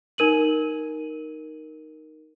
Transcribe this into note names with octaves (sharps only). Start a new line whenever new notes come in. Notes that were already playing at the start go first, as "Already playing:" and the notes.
D#4 A#4 D#7 F#7